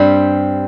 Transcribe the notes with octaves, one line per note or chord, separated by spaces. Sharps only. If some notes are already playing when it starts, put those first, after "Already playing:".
Already playing: G2 G3 C4